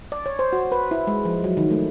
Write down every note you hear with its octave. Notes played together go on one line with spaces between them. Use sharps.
D5
C#5
C5
F#4
B4
E4
G#3
F3
F#3
D#3
A3